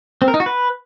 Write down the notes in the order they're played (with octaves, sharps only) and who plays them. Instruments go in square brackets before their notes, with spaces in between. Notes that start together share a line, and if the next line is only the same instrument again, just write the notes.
[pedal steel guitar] C4
A#4
D#4
F#4
B4